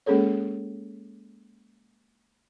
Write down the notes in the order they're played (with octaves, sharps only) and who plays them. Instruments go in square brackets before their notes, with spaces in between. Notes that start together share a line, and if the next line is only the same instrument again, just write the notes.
[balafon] G#3 A#3 C#4 G#4 A4 C#5